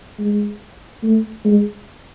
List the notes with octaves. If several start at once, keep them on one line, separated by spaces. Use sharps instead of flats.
G#3
A3
G#3